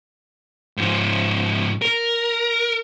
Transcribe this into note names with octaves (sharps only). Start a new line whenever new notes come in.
G#2 F3
A#4